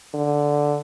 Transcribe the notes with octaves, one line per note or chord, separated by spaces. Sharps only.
D3